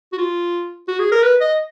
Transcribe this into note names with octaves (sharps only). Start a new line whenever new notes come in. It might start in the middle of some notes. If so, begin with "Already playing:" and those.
F#4
F4
F#4
G#4
A#4
B4
D#5